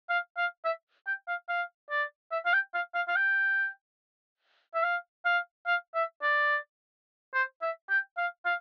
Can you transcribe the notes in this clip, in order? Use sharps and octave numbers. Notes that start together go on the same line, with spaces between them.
F5
F5
E5
G5
F5
F5
D5
E5
F5
G5
F5
F5
F5
G5
E5
F5
F5
F5
E5
D5
C5
E5
G5
F5
F5